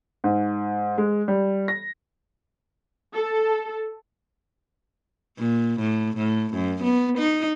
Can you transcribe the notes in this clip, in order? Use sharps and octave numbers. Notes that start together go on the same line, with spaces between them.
G#2
G#3
G3
A#6
A4
A#2
A2
A2
F#2
B3
D#4